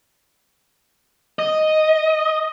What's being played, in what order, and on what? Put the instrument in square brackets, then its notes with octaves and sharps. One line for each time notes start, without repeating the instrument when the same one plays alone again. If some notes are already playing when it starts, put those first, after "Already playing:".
[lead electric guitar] D#5